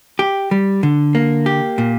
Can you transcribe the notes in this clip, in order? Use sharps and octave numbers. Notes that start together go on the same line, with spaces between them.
G4
G3
D3
A#3
G4
A#2